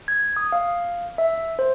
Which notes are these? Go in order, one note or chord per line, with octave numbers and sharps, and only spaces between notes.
G#6
D#6
F5
E5
C5